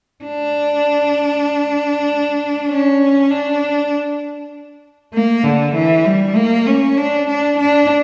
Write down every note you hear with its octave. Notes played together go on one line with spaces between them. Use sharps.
D4
C#4
D4
A#3
D3
E3
G3
A#3
C#4
D4
D4
D4